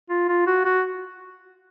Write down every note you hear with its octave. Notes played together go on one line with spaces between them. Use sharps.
F4
F4
F#4
F#4